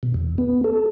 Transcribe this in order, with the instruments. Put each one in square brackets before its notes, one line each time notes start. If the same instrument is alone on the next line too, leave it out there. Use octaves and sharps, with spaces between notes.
[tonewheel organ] B2
E2
B3
A4